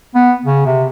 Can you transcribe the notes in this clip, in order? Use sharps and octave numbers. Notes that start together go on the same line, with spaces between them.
B3
C#3
C3